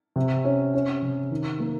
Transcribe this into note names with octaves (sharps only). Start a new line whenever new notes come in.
C3
C#4
C#4
C3
D#3
A#3